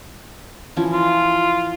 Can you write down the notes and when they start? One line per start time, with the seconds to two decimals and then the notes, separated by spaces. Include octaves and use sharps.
0.77 E3 F3 C#4
0.93 F4